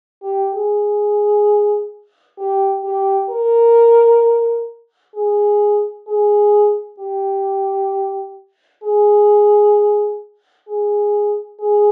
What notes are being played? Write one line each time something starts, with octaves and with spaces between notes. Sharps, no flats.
G4
G#4
G4
G4
A#4
G#4
G#4
G4
G#4
G#4
G#4